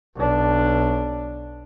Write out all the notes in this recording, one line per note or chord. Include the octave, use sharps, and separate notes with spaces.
B1 D4